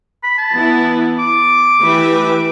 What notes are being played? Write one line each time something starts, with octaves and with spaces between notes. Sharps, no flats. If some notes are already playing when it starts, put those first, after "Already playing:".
B5
A5
E3 B3 E4
D6
E3 A3 G4 B4 E5